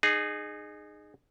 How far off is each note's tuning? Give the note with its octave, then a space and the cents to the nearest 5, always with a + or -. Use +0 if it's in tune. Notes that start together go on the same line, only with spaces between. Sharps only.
D#4 -30 G#4 +0